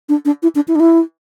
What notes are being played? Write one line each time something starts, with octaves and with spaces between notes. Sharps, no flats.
D4
D4
E4
D4
E4
D4
E4